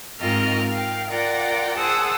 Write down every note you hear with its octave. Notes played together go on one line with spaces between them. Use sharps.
G#2 C4 F4 A#4 D#5 F6
F5 G5
F4 A#4 D5 F#5 G5
G#4 C5 F#5 A5 D#6 E6